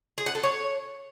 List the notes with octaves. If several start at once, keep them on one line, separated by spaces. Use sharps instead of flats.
G#4
F#5
A4
C#5